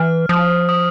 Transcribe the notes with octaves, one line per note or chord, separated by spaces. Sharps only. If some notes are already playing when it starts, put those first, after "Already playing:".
Already playing: E3 F6
F3 D#6
D#6